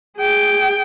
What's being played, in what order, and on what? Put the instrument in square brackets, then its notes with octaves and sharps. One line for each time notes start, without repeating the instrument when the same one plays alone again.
[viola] G#4 G5